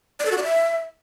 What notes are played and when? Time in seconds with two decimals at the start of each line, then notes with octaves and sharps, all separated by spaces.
0.20 D5
0.26 A4
0.31 F#4
0.37 D5
0.43 E5